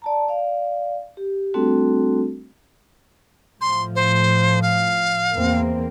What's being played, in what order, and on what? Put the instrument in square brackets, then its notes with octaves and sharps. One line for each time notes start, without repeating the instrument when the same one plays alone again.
[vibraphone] D5 A5 A#5
D5 F5
G4
G3 A3 C4 D4 F#4 A4
[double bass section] A2 F3 [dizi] C6
[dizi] C5
F5
[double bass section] E2 A#3 C4